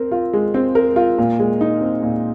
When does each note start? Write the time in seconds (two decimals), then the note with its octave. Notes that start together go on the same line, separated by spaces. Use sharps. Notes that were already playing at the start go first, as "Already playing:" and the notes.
Already playing: C4 A#4
0.12 F4
0.33 G#3
0.54 C4
0.75 A#4
0.96 F4
1.18 A#2
1.39 G#3
1.61 D#4
1.81 C4
2.03 A#2